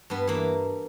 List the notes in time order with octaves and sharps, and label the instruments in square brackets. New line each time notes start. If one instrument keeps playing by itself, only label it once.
[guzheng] G2 B3
E3 A#3